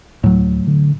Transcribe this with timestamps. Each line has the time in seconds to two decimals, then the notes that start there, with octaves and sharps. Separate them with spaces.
0.24 D2 A2 F#3
0.67 D3